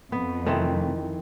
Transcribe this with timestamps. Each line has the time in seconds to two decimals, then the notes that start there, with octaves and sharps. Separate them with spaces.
0.12 F2 B3
0.47 C3 D#3 E3 A3 C4